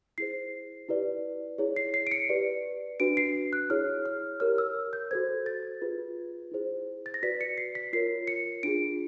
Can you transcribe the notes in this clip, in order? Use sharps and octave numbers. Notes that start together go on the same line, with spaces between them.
E4 G#4 C5 C7
E4 G4 B4 D5
E4 G#4 C#5
C7
C7
D7
C#7
G4 B4 D5
D4 F#4 B4 D7
C7
F#6
E4 G#4 C#5 F6
F6
G4 A#4 C#5 F6
E6
G6
F#4 A4 C5 G#6
A6
F4 G#4 B4
E4 G#4 C5
A6
A#6
F#4 B4 D5 B6
C#7
C7
B6
F4 A#4 C#5 C7
C#7
D4 F4 G#4 D7